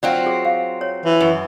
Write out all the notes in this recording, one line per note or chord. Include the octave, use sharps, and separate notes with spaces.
F#3 C4 F4 D5
G#4
F5
C#5
E3
F#2